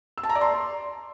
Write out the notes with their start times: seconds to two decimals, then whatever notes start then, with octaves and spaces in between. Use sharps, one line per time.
0.18 E6
0.23 A5
0.29 A#5
0.35 D5
0.41 C6